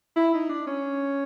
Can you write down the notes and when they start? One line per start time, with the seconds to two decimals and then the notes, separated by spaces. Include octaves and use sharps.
0.16 E4
0.34 D#4
0.49 D4
0.67 C#4